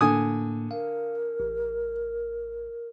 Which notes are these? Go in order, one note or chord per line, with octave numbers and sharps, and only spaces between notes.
A2 D3 A#3 G#5 D#6
A#4 F5
A1